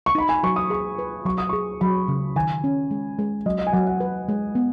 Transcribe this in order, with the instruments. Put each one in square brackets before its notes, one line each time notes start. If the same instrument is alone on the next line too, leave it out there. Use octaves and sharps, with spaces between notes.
[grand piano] C#6
[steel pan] D#4 [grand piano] B5
[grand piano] G#5
[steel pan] F#3 [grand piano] C#6
[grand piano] D#6
[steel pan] G#4 [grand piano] C#6
[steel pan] B4
[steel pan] F#3 [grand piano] C#6
[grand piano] D#6
[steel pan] G#4 [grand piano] C#6
[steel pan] F#3 [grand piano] B5
[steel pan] C#3
[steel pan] D#3 [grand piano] G#5
[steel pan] C#4
G#3
G#3
[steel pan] F#3 [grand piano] D#5
[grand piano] D#5
G#5
[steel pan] F#3 [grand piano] F#5
[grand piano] F#5
[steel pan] B4
G#3
B3